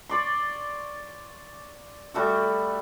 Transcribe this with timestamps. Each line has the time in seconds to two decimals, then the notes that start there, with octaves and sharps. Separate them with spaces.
0.09 C#5 D5 C6
2.14 G3 A3 F#4